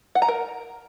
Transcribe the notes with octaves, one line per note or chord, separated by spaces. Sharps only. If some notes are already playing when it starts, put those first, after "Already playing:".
F#5
A#5
A#4